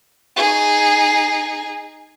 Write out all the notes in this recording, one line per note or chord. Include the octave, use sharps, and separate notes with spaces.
D#4 G#4